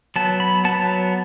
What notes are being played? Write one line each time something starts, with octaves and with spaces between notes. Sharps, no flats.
F#3 B3 A5
B5
F#3 B3 A5